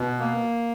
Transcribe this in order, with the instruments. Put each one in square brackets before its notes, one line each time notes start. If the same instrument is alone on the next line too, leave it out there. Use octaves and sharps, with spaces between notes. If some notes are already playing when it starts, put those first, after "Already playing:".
Already playing: [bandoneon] B2
A#3